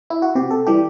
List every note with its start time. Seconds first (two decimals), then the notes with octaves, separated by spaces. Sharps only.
0.10 E4
0.22 F#4
0.35 C3 G4
0.51 A4
0.67 E3 G3 G4